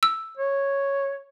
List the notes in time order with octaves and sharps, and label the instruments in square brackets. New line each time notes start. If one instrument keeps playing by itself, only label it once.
[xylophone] E6
[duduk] C#5